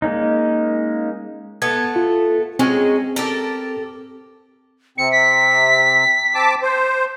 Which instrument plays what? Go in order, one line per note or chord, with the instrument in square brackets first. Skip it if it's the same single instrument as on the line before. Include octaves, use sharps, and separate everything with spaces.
[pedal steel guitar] G#3 A#3 C#4 D#4
[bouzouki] A3 B3 A4 [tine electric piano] G#6
[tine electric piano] F4
[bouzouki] F#3 G#3 C#4 [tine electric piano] C4
[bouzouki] G4 A4 A#4
[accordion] C3 C4 [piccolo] C#7
[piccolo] B6
[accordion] C4 A5 D6
C5